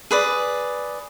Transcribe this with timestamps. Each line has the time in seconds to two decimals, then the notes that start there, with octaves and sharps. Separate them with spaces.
0.11 G#4 B4 D5